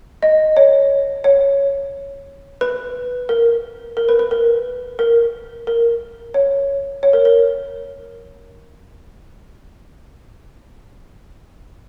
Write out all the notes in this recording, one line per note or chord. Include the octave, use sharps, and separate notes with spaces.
D#5
C#5
C#5
B4
A#4
A#4
B4
B4
A#4
A#4
A#4
C#5
C#5
A#4
A#4